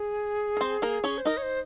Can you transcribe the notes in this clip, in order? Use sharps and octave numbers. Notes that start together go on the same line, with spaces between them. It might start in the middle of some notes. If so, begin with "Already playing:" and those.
Already playing: G#4
A#4
C4 C5
A#3 A#4
C#4 C#5
C5
D#4 A#4 D#5
C#5
C5